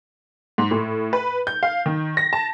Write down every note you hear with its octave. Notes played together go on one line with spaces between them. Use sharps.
G#2
A2
B4
G6
F5
D#3
A#6
A5